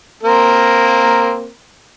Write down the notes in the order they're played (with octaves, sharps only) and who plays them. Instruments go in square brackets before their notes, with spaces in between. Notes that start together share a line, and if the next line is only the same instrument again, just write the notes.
[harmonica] A#3 C4 A#4